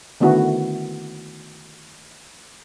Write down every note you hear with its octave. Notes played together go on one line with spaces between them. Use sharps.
D3 D#3 A3 B3 E4 F#4